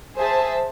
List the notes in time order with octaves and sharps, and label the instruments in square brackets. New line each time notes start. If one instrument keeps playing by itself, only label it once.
[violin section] G#4 C5 E5 A5